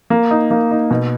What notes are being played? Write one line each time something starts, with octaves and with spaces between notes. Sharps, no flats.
A#3
D#4
A#3
D#4
B2